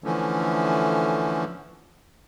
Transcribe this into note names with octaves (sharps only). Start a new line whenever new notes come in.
D3 E3 F3 A3 C#4